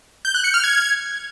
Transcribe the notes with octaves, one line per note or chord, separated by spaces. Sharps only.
G6
F#6
C#7
F6
G#6